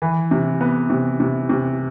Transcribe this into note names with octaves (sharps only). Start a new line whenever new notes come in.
E3
C3
B3
C3
C3
C3